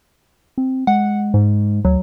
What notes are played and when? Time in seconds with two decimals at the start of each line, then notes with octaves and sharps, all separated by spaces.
0.58 C4
0.87 G#3 F#5
1.34 G#2
1.85 D2 F#3